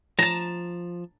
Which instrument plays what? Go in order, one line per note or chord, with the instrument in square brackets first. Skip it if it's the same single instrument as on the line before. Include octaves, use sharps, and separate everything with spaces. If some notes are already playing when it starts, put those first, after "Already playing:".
[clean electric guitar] F3 [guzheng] A5 A#5